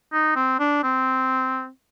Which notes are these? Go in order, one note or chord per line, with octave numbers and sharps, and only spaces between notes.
D#4
C4
D4
C4